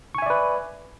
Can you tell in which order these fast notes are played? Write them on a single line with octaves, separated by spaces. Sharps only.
C#6 G#5 E5 D5 B4